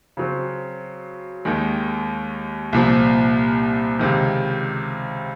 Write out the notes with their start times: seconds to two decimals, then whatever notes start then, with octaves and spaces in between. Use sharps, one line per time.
0.17 C#3 F#3 C4
1.45 D#2 D#3 G#3
2.73 C2 A#2 F3
3.99 C#2 C3 D#3